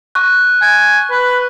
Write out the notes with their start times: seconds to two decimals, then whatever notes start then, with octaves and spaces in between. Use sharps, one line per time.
0.15 C#6 F#6
0.61 G#5
1.10 B4